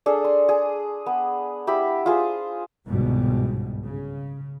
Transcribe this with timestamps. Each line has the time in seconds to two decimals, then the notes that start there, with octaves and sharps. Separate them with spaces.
0.06 D4 G#4 A4
0.24 C6
0.49 G#4
1.06 B3
1.67 E4 G4 E5 B5
2.06 F4 G#4 C5
2.87 G1 C2 G#2 B2 G3
3.84 C#3